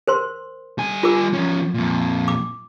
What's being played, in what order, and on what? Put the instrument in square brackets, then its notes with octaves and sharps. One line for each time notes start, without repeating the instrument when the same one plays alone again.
[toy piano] A#4 C5 C6
[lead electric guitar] G3 G#5
[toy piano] F4 A#4 D6
[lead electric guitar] F3 C#4
F2 A#2
[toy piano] D6